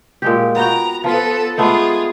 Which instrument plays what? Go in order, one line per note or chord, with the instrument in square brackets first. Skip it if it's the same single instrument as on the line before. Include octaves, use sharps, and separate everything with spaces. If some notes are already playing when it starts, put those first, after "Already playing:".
[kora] A#2 G#3 G4
[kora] B3 F#4 G5 [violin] A#5
[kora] F3 F4 [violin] B3 A4
[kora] G#3 A3 B3 [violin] F4 G#4